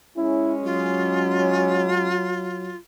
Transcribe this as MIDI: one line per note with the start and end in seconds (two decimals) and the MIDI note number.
0.17 2.15 56
0.17 2.15 61
0.17 0.54 64
0.65 2.74 54
0.65 2.78 65